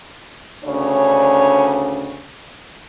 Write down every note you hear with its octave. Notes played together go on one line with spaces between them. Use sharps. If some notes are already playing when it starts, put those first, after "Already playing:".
D2 C#3 C#4 D4 C#5